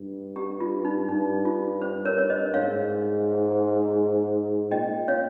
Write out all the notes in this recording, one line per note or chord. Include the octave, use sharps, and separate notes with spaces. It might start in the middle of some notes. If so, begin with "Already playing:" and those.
Already playing: G2
G4
F4
D#4
G2 D#4
F4
C5
A#4 C#5
C#5
C5 D#5
G#2 C#5 F5
A#2 D#5 G5
C#5 F5